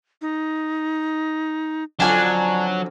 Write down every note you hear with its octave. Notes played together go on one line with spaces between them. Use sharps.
D#4
F2 D3 F#3 C#4 D4 G#5